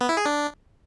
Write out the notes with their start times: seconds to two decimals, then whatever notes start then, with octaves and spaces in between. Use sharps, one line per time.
0.01 B3
0.09 E4
0.17 G#4
0.25 D4